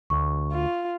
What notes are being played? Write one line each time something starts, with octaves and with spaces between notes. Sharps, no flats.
D2 C#6
F4